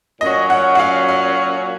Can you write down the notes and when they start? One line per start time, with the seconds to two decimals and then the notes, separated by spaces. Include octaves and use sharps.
0.21 A#2 F#3 C#4 F#4 D#5
0.50 F#5
0.75 F#5
0.79 F5
1.08 F5